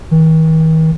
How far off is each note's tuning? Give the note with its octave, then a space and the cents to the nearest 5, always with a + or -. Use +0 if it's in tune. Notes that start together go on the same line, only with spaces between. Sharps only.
D#3 +45